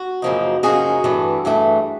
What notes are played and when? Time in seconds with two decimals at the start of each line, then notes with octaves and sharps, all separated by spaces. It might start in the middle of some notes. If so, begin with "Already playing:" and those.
Already playing: F#4
0.22 F#2 C#3 F3 A#3 D#4
0.63 F#2 C#3 F3 A#3 D#4 F#4 G#4
1.04 G2 E3 A3
1.45 G2 E3 A3